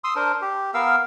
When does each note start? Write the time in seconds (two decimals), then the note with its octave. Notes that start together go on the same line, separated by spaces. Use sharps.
0.04 C6 D#6 E6
0.16 D4 A#4 C5
0.42 G4
0.74 B3 A#4 F5 E6